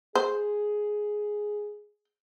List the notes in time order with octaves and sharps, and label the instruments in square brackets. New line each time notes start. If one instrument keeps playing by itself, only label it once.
[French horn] G#4 [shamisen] C5